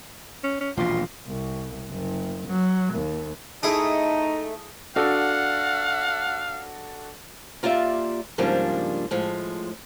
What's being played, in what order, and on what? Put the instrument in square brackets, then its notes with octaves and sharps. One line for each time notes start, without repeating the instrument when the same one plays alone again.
[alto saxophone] C#4
C#4
[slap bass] E1 A#1 B2 [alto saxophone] F4
[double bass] C2
F#1
F#3
D#2
[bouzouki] A3 [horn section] D#4 D#5 [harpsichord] E4 G#4
[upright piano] D4 F#4 A4 [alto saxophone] F5 [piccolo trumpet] F#5
[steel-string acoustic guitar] A#3 F4 G4 D5 E5
G#2 C#3 F3 G3 A#3 D4
A2 F3 G#3